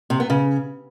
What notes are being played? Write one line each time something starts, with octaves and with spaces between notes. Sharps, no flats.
C3
B3
C#3